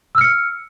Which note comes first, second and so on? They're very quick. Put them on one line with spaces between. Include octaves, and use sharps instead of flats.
E6 F6 C#7